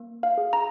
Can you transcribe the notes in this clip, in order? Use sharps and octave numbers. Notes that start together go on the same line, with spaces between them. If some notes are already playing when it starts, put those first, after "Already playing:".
Already playing: A#3
F5
G#4
A#5